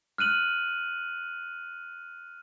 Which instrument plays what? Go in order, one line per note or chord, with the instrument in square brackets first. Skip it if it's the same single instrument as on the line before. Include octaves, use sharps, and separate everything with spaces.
[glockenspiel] F6 F#6 D#7 F#7